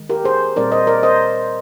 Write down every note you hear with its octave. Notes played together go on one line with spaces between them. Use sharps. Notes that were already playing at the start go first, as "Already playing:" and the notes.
Already playing: D#3 G#3
G4 A#4
G#4 C5
A#2 G3 C4 D#4 A#4 D5
C5 D#5
A#4 D5
C5 D#5